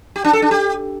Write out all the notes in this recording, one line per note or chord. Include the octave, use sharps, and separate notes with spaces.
G4
D4
A4
D4
G4